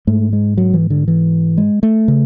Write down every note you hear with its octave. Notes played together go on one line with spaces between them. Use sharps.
G#2 A3
G#3
F#3
E3
D3
E3
G#3
A3
C#3